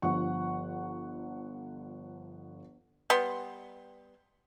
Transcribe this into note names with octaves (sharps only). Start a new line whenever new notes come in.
G1 F3 F#5 C#6
G3 B3 C6